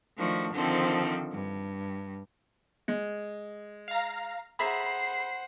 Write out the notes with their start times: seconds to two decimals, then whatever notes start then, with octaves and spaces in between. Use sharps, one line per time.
0.18 D#3 F3 A3 D4 F#4
0.53 D3 D#3 F3 C4 A4 C5
1.32 G2
2.88 G#3
3.88 F5 A#5
4.59 G#4 C5 E5 F#5 A#5 B5 C7